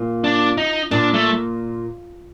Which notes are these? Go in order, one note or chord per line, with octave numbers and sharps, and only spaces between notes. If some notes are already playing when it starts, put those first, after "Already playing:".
Already playing: A#2
D4
D#4
A#2 D4
A3